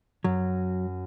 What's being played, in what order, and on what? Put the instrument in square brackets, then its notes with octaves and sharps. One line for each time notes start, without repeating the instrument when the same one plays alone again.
[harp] F#2 [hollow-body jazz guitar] F#3